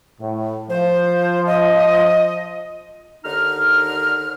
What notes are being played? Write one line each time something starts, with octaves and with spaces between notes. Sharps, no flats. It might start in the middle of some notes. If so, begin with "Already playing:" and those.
A2
F3 C5
D#5
D#2 D3 D#4 F6